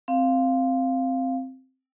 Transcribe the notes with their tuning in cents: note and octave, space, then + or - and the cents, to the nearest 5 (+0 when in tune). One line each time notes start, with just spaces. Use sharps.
C4 +0 F5 +0